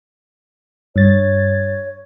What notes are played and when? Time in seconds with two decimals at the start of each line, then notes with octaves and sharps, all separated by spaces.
0.96 G2 C#5 A6